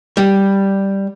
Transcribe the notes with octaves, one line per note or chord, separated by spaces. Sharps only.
G3